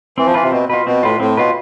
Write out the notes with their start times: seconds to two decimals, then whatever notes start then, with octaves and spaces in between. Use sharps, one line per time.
0.18 E3 C4
0.26 F3
0.34 E3 F4 B4
0.43 C3
0.52 B2 C4
0.69 B2 F4 B4
0.86 B2 C4
1.03 A2 F4 B4
1.20 A2 C4
1.37 B2 F4 B4